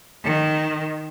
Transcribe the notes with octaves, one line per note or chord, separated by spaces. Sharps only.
D#3